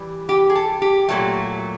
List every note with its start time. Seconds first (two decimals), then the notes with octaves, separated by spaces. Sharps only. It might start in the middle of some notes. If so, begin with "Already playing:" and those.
Already playing: E3 G3
0.29 G4
0.50 G#4
0.55 A4
0.82 G4
1.09 A#2 F#3 A3